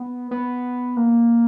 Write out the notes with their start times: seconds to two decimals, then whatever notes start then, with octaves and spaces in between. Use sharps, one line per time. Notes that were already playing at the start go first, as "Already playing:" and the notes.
Already playing: B3
0.31 B3
0.97 A#3